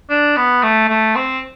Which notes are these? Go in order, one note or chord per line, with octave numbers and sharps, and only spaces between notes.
D4
B3
A3
A3
C4